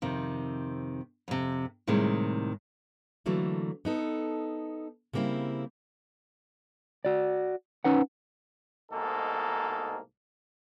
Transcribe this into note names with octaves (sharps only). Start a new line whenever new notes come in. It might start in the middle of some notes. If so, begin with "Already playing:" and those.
F2 C3 D#3
F2 C3
A2 C3 D#3 G3 G#3 E4
D3 E3 F#3 A3 A#3
B3 D#4 A4
C#3 G3 A#3 C4 E4
F#4 D5
C#4 D#4 B4 F#5
C2 G#2 B2 A#3 D#4 A4